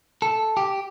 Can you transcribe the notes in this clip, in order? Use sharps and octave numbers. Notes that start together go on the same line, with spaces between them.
A4
G4